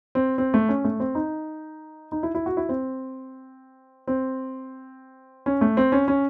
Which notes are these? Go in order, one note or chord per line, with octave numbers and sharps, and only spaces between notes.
C4
C4
A3
C#4
A3
C4
D#4
D#4
E4
E4
F#4
E4
C4
C4
C#4
A3
C4
C#4
C#4